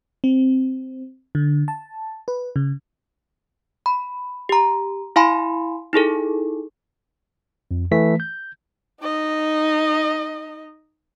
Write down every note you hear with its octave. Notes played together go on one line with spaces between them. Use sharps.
C4
D3
A5
B4
C#3
B5
G4 A#5
E4 F5 G#5 B5 C6
D#4 E4 G#4 A4
F2
E3 A3 B6
G6
D#4 D#5